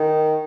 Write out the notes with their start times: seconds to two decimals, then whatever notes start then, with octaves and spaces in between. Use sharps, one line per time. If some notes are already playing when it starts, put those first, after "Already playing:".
Already playing: D#3